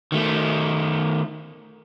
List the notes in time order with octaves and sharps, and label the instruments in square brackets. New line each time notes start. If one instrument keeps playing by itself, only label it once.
[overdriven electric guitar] D#3 A3